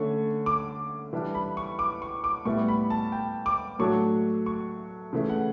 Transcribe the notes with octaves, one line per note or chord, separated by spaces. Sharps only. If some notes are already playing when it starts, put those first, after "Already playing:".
Already playing: D3 A3 C#4 C#6
D6
E3 G3 D4
B5
C#6
D6
C#6
D6
A2 G3 B3 E4 C#6
B5
A5
G5
D6
A2 F#3 A3 D4 C#6
C#6
C#3 E3 A3
F#5